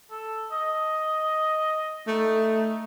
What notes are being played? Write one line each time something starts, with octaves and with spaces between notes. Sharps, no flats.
A4
D#5
A3 D#4